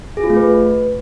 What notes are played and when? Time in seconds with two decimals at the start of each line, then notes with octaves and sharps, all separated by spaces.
0.17 G#4
0.23 F4
0.30 A3
0.36 B4